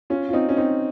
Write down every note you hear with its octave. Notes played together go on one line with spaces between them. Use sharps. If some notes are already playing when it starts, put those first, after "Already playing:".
C#4 F4
F4
C4 D#4
C#4
C4 D#4